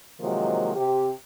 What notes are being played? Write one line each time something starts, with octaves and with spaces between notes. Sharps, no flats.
C3 D#3 F3 F#3 G#3 A#3
C3 G4